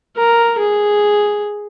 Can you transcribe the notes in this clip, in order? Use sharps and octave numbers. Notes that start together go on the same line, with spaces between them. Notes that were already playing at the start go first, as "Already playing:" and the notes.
A#4
G#4